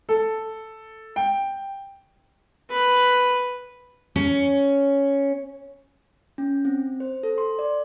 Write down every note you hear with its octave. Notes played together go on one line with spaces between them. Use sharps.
A4
G5
B4
C#4
C#4
C4
C5
A4
C6
D5